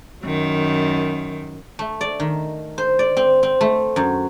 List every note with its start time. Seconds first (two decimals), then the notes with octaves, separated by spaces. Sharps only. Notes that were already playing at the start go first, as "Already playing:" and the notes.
0.23 F#2 D#3
1.79 A3
2.01 D5
2.20 D#3
2.78 C5
2.99 D5
3.17 C4
3.43 C4
3.61 A3
3.96 F#2